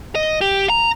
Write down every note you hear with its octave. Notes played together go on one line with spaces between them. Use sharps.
D#5
G4
A#5